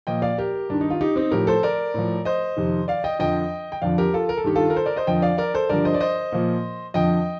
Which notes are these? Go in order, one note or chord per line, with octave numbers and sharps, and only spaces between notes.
A#2 F3 D#5 G5
D5 F5
G4 A#4
G2 D#3 D4
D#4
F4
D#4 G4
C4 D#4
A2 F3 G4 A#4
A4 C5
A#4 D5
A2 F3
C5 D#5
F2 C3 D#3
D5 F5
D#5 G5
F2 D3 F3 D#5 G5
G5
F2 D3 F3 D5 F5
G4 A#4
F4 A4
A#4
A4
G2 D#3 G4
F4 A4
A#4
A4 C5
A#4 D5
C5 D#5
F2 D3 F3 D#5 G5
D5 F5
A#4 D5
A4 C5
G2 D3 F3 A#4 D5
C5 D#5
D5
C5 D#5
A#2 F3
F2 D3 F3 D#5 G5